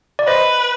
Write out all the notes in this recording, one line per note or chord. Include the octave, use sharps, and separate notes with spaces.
D5
B4 C5 D#5